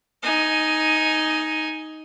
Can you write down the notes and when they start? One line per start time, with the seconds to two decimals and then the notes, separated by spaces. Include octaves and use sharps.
0.23 D#4 G#5